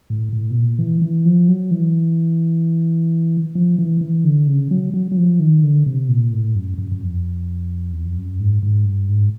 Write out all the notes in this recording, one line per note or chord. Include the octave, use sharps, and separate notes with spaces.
A2
A2
B2
A#2
E3
E3
F3
F#3
E3
F3
E3
E3
D3
C#3
F#3
F#3
F#3
F3
D#3
D3
C3
A#2
A2
F#2
F#2
F#2
F2
E2
F2
F#2
G#2
G#2
G2
G#2